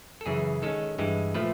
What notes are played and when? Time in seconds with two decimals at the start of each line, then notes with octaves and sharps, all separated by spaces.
0.21 A4
0.26 F#2 C#3 E3 G#4
0.62 D#3 G#3 C#4 A4
0.98 G2 E3 G#3
1.34 A#2 F3 A3 B4